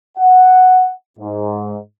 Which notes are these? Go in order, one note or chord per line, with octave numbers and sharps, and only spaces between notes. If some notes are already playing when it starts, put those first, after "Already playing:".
F#5
G#2